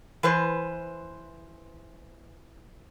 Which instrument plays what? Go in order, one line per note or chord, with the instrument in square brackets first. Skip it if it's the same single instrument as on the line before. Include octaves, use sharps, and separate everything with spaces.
[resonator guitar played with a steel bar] E3 B4 C5